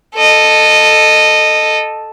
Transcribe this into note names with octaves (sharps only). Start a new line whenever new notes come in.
A4 D#5